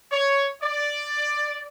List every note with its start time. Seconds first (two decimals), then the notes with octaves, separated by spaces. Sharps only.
0.12 C#5
0.62 D5